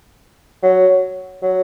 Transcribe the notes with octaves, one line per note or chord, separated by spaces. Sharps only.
F#3
F#3